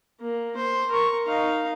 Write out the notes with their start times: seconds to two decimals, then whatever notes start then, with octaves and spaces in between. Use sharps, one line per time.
0.20 A#3
0.56 C5
0.90 A#4 C#6
1.27 D#4 F5